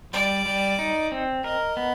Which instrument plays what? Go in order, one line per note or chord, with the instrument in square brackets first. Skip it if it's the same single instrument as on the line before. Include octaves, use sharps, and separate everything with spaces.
[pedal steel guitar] G3 [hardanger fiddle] D5
[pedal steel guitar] G3
D#4
C4
[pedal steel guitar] A#4 [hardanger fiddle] D#5
[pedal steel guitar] B3